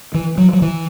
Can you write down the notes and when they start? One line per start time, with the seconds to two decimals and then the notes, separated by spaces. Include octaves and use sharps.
0.14 E3
0.38 F#3
0.53 F#3
0.62 E3